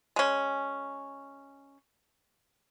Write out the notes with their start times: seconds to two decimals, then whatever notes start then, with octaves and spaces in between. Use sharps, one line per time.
0.16 G#3 C#4